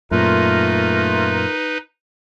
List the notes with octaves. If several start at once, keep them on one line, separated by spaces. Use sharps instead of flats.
F#2 A#2 A3 D#4 F4 A#4 B4